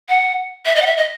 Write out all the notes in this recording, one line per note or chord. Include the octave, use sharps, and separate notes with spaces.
F#5
E5
D#5
F#5
E5
D#5